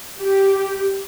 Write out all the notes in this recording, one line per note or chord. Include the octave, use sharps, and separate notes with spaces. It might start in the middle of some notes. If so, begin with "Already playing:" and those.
G4